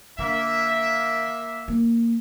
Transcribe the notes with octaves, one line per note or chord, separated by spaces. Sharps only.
D3 A#3 E5
A#3